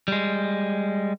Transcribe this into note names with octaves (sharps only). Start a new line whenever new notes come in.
G3 G#3